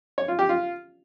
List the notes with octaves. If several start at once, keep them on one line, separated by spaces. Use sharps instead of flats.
C#5
F4
G4
F4